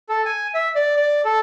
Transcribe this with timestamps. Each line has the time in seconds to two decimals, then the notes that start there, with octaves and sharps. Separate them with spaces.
0.09 A4
0.25 G#5
0.54 E5
0.76 D5
0.96 D5
1.25 A4